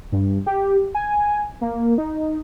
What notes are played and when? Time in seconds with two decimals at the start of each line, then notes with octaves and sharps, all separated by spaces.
0.12 G2
0.46 G4
0.95 G#5
1.61 A#3
1.98 D#4